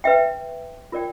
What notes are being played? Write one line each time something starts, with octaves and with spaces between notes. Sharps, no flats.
B4 E5 G5
F4 A#4 D5 G5